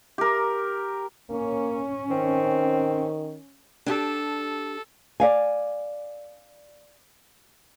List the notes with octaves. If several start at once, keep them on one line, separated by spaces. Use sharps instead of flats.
G4 A#4
A#3 C#4
D#3 C4
D4 G4 A4 A5
D5 F5 G#5